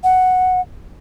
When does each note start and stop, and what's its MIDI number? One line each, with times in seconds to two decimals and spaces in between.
0.04 0.61 78